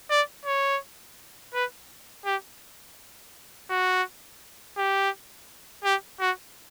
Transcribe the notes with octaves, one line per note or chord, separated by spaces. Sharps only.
D5
C#5
B4
G4
F#4
G4
G4
F#4